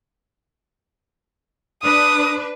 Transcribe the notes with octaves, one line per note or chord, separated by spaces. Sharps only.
D4 B4 D#6